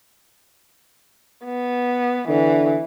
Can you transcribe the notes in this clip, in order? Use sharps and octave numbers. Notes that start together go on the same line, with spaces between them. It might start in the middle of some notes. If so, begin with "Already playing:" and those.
B3
D3 E3